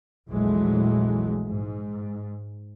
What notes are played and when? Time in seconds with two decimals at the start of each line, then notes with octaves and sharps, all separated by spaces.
0.29 A#1 E2 E3 F#3 G#3 A3
1.48 G#2